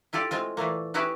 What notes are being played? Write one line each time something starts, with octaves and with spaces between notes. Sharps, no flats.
E4 F4 G4 A4 D5
A2 G#3 C4 F4
A#2 E3 A3 A#3
B3 C#4 E4 F#4 G4 B4